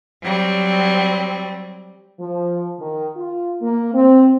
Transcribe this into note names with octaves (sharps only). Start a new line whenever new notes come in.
F#3 G3 C4
F3
D#3
F4
A#3
C4